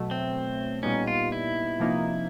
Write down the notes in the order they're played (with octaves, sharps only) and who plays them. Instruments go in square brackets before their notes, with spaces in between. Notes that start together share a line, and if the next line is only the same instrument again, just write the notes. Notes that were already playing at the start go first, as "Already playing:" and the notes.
Already playing: [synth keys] B2 F#3 A3
[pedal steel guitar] C4
[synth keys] A#2 G3 B3 D#4 [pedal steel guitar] C#4
[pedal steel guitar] F4
E4
[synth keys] C3 F3 A#3 D#4